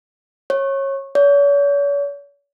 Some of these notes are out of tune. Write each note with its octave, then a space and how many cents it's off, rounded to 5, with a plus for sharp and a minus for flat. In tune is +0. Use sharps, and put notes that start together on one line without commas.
C#5 -20
C#5 +45